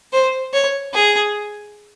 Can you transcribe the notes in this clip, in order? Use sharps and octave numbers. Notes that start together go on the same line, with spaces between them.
C5
C#5
G#4